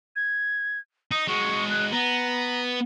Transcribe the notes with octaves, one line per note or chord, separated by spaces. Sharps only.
G#6
D#4 D#6
G#3 F#4 C#6
F#6
B3 A#5